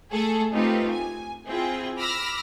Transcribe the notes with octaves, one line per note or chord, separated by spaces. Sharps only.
A3 G#4 A4
A3 C4 D#4 F4 G4 B4
G#5
C4 E4 F4 G#4 G5
B5 D6 E6 F6 A#6